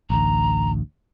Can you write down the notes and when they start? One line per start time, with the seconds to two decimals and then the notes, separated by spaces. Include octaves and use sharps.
0.10 A1 D2 A#5